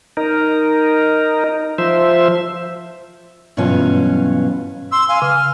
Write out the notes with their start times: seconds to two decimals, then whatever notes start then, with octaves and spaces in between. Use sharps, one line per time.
0.17 D#4 A#4
1.78 F3 C5 E5
3.57 G2 B2 E3 F#3 C#4 F4
4.92 C6 E6
5.08 F5 G#5
5.22 C#3 F6